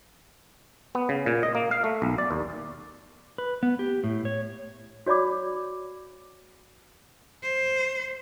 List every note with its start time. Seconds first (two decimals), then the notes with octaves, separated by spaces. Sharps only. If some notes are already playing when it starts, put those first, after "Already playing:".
0.95 B3
1.09 C#3
1.26 A#2
1.43 D#5
1.55 A#3
1.71 F5
1.84 A3
2.02 B1
2.18 D5
2.31 D#2
3.38 B4
3.63 B3
3.79 G4
4.04 A2
4.25 C#5
5.06 F#4 C#5 D5 B5 D6
7.43 C5